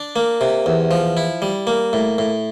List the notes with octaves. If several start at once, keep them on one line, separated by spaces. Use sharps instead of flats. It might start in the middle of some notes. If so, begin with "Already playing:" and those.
Already playing: D4
A#3
C3
E2
F3
E4
G3
A#3
A2
A2